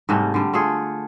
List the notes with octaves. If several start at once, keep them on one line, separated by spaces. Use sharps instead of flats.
G#2 C3 G3 A3
D3 G3
A3 F4 G#4